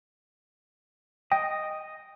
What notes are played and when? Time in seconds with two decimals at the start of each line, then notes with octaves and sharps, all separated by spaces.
1.32 D#5 G5